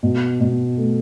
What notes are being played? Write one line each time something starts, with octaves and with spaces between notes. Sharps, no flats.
B2
B2
A3